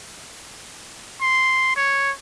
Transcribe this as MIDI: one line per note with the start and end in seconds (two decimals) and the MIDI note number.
1.21 1.73 84
1.76 2.11 73